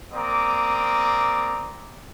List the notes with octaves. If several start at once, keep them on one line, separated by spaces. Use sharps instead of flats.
A#3 C4 D5 A#5 D6 D#6